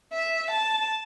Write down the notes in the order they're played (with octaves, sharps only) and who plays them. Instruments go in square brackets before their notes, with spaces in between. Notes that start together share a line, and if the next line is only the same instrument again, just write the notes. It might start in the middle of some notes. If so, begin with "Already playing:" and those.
[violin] E5
A5